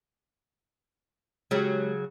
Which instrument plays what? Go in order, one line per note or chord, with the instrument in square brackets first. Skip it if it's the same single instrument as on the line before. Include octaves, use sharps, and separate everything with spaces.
[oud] C#3 F#3 [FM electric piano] G#3 G4